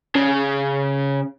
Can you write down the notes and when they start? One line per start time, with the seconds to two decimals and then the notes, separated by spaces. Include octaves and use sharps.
0.15 C#3